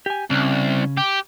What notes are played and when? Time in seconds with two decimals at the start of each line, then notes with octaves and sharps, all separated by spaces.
0.06 G4 G#5
0.30 C2 C#3 C#4
0.97 G4